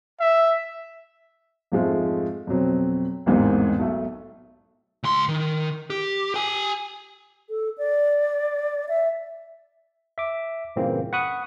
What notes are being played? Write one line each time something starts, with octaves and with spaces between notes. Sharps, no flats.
E5
F2 G#2 F3 G#3 A3
F2 B2 F#3 C4
A1 E2 G#2 A#3 C4
B1 A3 A4
C#2 C6
D#3
G4
G4 G#5
A4
D5
E5
E5 D6
G2 A#2 C#3 E3 A#3 C4
F#5 B5 C#6 D#6 F#6